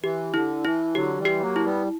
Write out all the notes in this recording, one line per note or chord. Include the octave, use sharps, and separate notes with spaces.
E3 G4
D3 E4
E3 E4
D3 F#3 G4
E3 G3
G4
F#3 A#3
E4
G3 B3